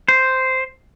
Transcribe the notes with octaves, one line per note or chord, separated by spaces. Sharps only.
C5